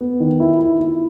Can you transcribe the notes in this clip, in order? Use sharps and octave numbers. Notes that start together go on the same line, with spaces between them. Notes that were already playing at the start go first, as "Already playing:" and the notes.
B3
D#3
E4
E4
E4